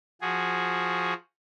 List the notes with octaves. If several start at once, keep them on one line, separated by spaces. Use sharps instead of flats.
F3 F#4 G#4